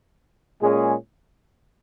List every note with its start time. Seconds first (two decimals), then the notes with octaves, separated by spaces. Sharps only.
0.61 A#2 G#3 C#4 G#4